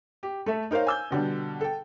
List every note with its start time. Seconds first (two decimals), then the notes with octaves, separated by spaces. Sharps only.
0.23 G4
0.46 A3 A4 E5
0.71 D#4 A#4 C5 C#5 F5
0.87 G#5 E6 G6
1.11 B2 D3 G3
1.61 A4 G5